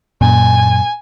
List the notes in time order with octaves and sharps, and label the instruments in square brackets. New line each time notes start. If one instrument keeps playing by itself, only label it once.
[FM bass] F#2 [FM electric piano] A#2 [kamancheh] G#5